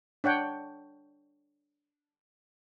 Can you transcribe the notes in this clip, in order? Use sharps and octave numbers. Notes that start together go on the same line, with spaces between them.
D4 C#5 F#5 G5